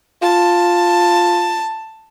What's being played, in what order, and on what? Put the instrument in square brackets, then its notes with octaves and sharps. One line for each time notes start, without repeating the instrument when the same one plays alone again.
[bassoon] F4 [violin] A5